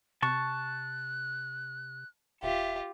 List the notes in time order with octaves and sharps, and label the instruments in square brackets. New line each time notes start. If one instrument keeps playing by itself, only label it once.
[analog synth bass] C3 [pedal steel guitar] A5 C#6 [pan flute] F#6
[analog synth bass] D#1 [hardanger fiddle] F4 G4 [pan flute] E5